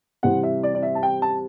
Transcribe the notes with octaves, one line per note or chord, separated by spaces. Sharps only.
C3 E3 G3 C4 F#5
E5
D5
D5
E5
A5
G5
A5